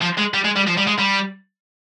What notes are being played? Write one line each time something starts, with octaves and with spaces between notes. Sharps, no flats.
F3
G#3
G3
G#3
G3
F3
G3
G#3
G3